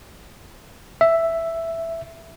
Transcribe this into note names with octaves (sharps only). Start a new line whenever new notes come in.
E5